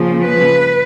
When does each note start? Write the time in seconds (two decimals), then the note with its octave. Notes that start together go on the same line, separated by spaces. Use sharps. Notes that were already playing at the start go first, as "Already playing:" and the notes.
Already playing: C#3 F3 A#3
0.23 B4